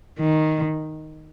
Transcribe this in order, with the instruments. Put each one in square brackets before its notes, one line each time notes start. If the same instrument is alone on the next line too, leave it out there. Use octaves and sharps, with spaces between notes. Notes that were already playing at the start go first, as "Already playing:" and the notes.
[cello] D#3